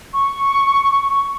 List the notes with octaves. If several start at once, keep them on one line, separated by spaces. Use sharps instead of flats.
C#6